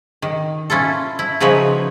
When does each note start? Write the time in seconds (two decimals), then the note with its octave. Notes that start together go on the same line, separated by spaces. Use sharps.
0.22 D#3
0.70 C#4 E4 F4 A4
1.19 E4
1.40 C#3 F3 F#3 D#4 B4 C#5